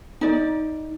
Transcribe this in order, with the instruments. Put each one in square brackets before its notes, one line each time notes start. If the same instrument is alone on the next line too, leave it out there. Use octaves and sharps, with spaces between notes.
[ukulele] D#4 D5